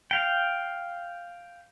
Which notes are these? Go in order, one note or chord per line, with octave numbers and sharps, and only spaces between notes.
F5 G5